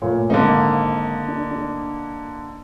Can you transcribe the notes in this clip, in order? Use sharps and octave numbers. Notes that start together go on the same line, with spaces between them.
A#2 A3 C#5
G#1 D3 A#3 D#4 A#4
D4
D4